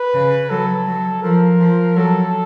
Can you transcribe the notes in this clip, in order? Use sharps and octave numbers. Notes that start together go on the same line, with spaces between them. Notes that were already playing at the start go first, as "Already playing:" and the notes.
Already playing: B4
C#3
F#3 A4
F#3
F3 A#4
F3
F#3 A4